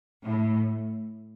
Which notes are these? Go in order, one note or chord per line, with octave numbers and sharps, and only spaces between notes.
A2